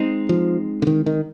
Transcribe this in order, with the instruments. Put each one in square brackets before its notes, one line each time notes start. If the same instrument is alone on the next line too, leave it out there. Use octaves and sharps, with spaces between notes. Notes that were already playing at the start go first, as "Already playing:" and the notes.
Already playing: [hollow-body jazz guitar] G#3 C4 D#4
[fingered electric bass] F3
D3
D#3
D#3